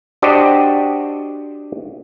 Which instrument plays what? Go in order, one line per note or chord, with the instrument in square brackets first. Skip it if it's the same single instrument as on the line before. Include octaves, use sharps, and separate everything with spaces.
[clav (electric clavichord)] D4 F#4 G4 C5 D5 D#5